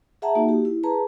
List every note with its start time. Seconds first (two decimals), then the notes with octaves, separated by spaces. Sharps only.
0.22 G#4 E5 F#5 A5 A#5
0.35 A#3 D#4 F#4
0.49 G4
0.65 E4
0.83 G#4 B4 A5 A#5